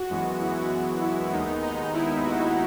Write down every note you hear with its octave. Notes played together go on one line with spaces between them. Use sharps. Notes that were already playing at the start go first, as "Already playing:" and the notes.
Already playing: F#4
F#2 E3 G#3 B3
E4
F#4
E4
D#2 D#3 G#3 B3 D#4
D#4
E4
F#4